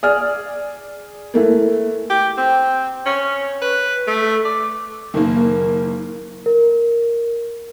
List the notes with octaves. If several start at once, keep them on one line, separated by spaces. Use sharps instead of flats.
G#4 D5 F6
E3 A3 A#3
G4
C4
C#4
B4
A3
D5
F#1 D#3 A#3
A#4